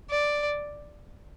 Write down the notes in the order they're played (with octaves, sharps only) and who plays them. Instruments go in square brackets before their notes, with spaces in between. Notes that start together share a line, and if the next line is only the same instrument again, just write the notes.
[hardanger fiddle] D5